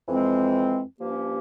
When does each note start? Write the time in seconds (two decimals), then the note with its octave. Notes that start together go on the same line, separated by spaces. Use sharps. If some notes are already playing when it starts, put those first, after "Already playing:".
0.07 F2 E3 G#3 C4
1.01 G2 F3 A#3 C#4 G4